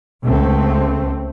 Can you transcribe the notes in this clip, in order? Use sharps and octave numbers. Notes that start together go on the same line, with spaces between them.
C#2 A3 C4